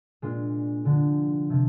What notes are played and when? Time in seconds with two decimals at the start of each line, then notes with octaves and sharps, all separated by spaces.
0.22 A#2 G#3 D4 F4
0.85 D3 F3 G#3
1.50 C3 F3